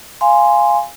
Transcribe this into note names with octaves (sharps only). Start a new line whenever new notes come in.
F5 G#5 C6